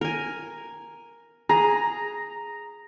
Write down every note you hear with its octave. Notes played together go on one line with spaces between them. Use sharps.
A#4 G#5
G#4 A#5